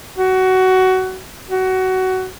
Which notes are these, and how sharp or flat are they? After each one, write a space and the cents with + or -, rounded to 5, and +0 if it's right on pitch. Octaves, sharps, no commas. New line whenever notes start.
F#4 +20
F#4 +20